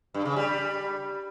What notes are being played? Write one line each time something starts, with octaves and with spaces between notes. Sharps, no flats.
G2
C#3
G3